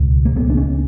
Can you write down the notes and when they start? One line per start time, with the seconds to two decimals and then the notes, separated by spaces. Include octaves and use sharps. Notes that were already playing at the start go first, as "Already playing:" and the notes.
Already playing: C#2 B2
0.25 A#3
0.36 C#2 B3
0.50 D4
0.57 C#4